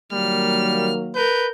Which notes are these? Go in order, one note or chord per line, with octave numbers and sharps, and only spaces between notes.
D#3 F#3 G3 A#3 F6
A#4 B4 G6